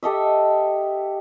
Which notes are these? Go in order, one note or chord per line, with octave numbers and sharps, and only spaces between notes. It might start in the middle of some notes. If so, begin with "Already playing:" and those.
G4 A4 D#5 E5